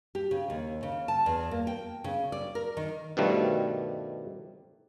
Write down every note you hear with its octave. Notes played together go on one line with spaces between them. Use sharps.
G4
C#3
D#2
C#3
A5
E2
A#3
G5
C#3
D5
A#4
D#3
G2 B2 D#3 F3 G3 A3